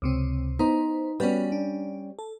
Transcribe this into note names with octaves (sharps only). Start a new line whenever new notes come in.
C#2 C3 C4
B3 D#4 C5
G3 B3 C#4 F#4 B4
D4
A4